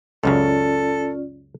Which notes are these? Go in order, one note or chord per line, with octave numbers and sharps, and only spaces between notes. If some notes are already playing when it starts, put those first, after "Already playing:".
C#2 F#2 C#3 C#4 F4 A4 D5